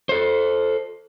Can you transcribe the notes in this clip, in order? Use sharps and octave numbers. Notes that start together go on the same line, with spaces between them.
A4 C5